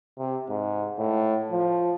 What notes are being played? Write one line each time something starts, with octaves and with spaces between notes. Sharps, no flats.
C3
G#2
A2
F3